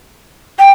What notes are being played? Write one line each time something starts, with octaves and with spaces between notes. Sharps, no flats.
G5